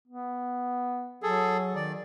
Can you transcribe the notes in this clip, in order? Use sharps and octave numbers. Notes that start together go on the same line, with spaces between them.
B3
F#3 G#4 A4
D#3 D5